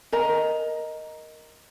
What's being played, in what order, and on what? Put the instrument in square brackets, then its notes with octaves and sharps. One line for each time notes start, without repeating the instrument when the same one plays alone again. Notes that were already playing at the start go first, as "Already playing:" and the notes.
[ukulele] A#4 D#5 A#5